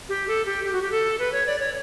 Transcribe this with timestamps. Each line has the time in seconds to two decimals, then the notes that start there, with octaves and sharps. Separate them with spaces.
0.09 G4
0.28 A4
0.46 G4
0.64 G4
0.73 F#4
0.82 G4
0.91 A4
1.19 B4
1.32 C#5
1.47 D5
1.59 C#5